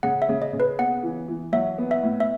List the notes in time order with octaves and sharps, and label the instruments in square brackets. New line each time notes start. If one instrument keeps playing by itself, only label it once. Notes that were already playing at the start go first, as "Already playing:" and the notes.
[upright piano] C#3 [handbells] F#5
[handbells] E5
[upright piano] C#3
[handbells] D#5
[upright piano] C#3
[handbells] B4
[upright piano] B3 [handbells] F#5
[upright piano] E3
E3
[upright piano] F#3 [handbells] E5
[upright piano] B3
[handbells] E5
[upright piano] A2
[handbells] E5